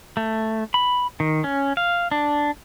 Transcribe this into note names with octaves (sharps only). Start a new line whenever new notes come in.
A3
B5
D#3
C#4
F5
D4